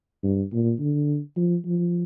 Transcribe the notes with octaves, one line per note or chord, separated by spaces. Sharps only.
G2
A#2
D3
F3
F3